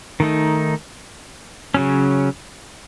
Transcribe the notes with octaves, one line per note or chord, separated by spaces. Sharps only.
D#3 A3 D#4
C#3 F#3 C#4